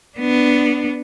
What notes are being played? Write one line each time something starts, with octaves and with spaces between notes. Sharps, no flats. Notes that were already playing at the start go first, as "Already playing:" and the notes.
B3 D4